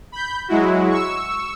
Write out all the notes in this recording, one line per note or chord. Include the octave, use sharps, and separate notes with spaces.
B5 G6
F#3 G#3 E4 F#4
C#6 E6